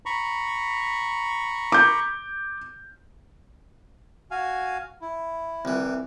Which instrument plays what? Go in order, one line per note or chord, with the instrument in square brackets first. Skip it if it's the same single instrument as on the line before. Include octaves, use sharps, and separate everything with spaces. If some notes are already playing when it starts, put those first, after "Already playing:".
[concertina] A#5 B5 C#6
[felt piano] D6 G6
[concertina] F#4 F5 G#5
E4
[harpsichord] C2 E3